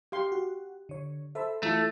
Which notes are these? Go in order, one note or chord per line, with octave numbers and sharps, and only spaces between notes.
G4 F5 C6
F#4
D3 C#5
A4 C5 E5 B5
E3 A3 E4 F4